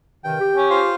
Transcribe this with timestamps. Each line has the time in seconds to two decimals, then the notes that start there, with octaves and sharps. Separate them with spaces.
0.24 G2 C3 D#3 G5
0.40 G4
0.55 C#4
0.70 F4 C5 F5